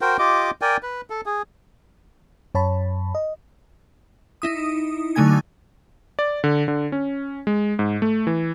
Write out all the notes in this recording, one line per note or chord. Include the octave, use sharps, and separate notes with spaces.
F#4 A#4 C5 G5
F4 G4 D#5 D6
A#4 D5 G5 G#5
B4
A4
G#4
F#2 C#5 A5 B5
D#5
D#4 E4 D#6
D3 F#3 A3 D#4 G#5 G#6
D5
D3
D3
C#4
G#3
G#2
A3
E3